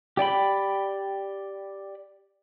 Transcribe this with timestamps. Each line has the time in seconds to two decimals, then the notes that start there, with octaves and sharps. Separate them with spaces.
0.17 G4 D5 G5 B5